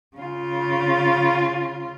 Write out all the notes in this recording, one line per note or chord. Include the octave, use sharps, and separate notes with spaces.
C#3 F4